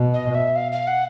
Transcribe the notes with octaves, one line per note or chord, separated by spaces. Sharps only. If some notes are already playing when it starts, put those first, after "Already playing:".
Already playing: B2
D#5
E5
F5
F5
F#5